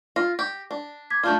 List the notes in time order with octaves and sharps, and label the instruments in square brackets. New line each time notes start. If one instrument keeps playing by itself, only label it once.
[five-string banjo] F4 [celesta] A#6
[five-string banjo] G4
D4
[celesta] D6 G#6 B6
[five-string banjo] A3 D4 F4 [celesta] F5 A5 G6